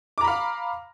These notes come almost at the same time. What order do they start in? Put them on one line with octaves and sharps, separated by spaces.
D6 A#5 B5 F5